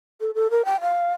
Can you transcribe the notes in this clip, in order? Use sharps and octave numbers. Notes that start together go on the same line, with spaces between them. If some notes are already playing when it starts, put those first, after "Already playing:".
A4
A4
A#4
G5
F5